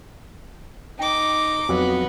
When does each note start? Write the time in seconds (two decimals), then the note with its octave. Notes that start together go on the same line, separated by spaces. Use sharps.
0.99 D#4 G5 D6
1.69 F2 F#3 B3